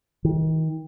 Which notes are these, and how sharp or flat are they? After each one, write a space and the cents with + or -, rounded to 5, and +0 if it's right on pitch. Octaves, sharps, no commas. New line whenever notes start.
D#3 +35